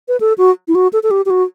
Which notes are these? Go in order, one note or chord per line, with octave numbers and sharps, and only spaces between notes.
B4
A4
F#4
E4
F#4
A4
A4
G4
G4
F#4